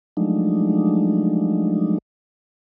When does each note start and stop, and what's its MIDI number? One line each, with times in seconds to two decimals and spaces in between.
0.17 1.98 53
0.17 1.98 54
0.17 1.98 56
0.17 1.98 57
0.17 1.98 62
0.17 1.98 63